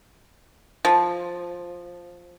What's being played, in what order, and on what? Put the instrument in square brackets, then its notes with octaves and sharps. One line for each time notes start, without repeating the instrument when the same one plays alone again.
[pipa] F3